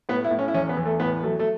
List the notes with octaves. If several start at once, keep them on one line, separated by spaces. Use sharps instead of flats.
A2 B3
E4
A2
C#4
E4
E2 C#4
B3
E2
A3
A2 B3
F#3 A3
A3